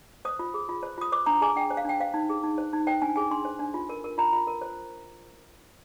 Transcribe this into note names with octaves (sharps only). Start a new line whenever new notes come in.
C5 D#6
F4
G#4
F4
C5
F4 D#6
C5 D6
D4 A#5
G#4 G#5
D4 G5
C5
F5
D4 G5
C5 F5
D#4
G#4
D#4
C5
D#4
C5 G5
D4 G#5
G#4 G#5
D4 C6
C5
D4
F4
A#4
A#4
F4 A#5
F4
A#4
C5